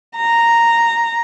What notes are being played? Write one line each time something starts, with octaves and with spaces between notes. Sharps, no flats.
A#5